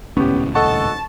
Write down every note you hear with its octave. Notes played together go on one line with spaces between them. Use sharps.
D#1 C#2 A2 B3 C#4 G4
A4 D#5 F#5 A5 C#6